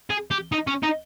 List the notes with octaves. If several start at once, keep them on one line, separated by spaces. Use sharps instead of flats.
G#4
G4
D#4
C#4
D#4